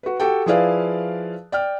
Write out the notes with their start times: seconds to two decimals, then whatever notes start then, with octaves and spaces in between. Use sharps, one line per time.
0.03 F#4 B4
0.20 F#4 G4 A4 G5
0.46 F3 E4 G#4 B4 D5 F5
1.52 D5 G5 F6